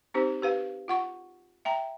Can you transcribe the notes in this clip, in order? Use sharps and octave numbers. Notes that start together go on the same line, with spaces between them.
C4 D#4 G4 C5
G4 B4 F5
F4 F#5 C#6
E5 G5 A#5